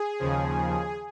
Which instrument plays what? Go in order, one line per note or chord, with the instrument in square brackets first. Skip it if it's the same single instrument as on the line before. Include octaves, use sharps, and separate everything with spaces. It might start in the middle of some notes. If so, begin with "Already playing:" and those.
Already playing: [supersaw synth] G#4
D#2 C#3 F3